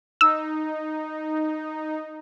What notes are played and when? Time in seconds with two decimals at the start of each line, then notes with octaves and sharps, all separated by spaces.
0.21 D#4 E6